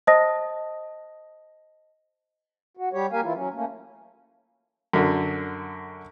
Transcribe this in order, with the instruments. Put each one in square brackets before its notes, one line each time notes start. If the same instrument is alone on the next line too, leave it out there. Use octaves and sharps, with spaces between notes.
[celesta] C5 D#5 A5 D#6 A#6
[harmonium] F#4
G3 G4 C#5
A#3 G4 A#4 F5 G#5
E3 E4 F4
F#3 C#4
A3 A#3 C#4
[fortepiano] F#2 D3